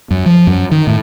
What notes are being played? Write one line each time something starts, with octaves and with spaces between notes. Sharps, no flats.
F#2
F3
F#2
D#3
A2